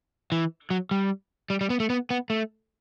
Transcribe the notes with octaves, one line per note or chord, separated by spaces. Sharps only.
E3
F#3
G3
G3
G3
B3
A3
B3
B3
A3